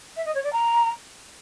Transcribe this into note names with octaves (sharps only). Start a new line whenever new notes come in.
E5
D#5
C#5
D5
A#5